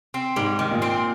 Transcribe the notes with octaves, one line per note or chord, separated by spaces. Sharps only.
C4
G#2 G3
D#3
A#2
C4